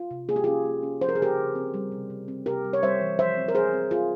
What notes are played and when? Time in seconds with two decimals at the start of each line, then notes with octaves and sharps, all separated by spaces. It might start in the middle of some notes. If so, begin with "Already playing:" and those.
Already playing: F4
0.11 C3
0.29 A#3 G#4
0.36 G4
0.44 C#4 F4 G#4
0.65 A#3
0.83 C#4
1.01 F3 C5
1.09 A#4
1.15 G#4
1.20 C#3 G4 A#4
1.37 C#3
1.55 C4
1.74 G3
1.92 C3
2.10 C3
2.28 C4
2.46 C3 G4 A#4
2.65 G3
2.73 C#5
2.83 G3 C5 E5
3.01 E3
3.19 F3 C5 E5
3.37 C4
3.48 A#4
3.55 F3 G#4 C5
3.73 C4
3.91 C4 F4 G#4